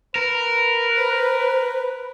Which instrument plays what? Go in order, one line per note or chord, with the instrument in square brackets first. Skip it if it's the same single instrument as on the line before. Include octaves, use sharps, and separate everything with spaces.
[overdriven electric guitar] A#4 [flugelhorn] B4
[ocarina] C5